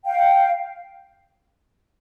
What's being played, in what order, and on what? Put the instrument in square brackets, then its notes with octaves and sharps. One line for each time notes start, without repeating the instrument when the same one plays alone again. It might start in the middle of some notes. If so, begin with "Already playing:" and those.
[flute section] F5 G5